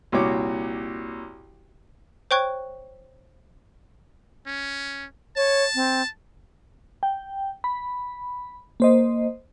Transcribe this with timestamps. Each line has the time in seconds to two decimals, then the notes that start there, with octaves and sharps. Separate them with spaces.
0.12 C2 A#2 F#4 C#5 D6
2.31 C5 C#5 G5 C#6 F#6 G#6
4.46 C#4
5.36 C#5 A5
5.75 C4
7.03 G5
7.64 B5
8.80 A#3 C5 D#5